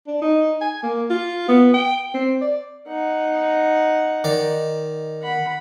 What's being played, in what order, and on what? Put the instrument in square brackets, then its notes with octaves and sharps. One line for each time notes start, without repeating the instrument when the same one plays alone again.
[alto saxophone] D4
D#4
G#5
A#3
F4
B3
G5
C4
D5
[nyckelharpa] D#4 F#5
[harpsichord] D#3 D5
[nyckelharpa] F#5 B5